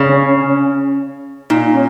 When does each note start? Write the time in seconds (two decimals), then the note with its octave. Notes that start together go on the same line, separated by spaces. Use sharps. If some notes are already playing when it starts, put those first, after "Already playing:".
Already playing: C#3
0.09 C#4
1.50 A#2 D#4
1.74 C#4